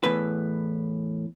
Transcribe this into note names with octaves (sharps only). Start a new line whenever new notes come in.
E2 A2 B4